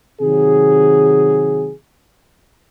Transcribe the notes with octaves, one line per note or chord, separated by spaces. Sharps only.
C3 D#3 F#3 G#4